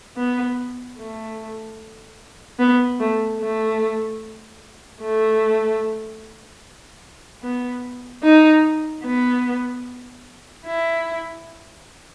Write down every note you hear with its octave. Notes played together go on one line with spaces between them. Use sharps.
B3
A3
B3
A3
A3
A3
B3
D#4
B3
E4